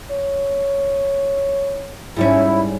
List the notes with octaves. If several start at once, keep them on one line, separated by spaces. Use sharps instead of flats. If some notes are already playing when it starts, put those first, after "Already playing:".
C#5
G#2 G3 C#4 E4